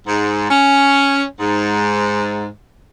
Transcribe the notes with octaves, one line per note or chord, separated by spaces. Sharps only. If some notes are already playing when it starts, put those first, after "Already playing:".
G#2
C#4
G#2